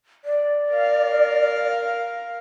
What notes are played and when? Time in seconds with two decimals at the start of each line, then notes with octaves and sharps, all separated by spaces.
0.25 D5
0.70 A#4 F5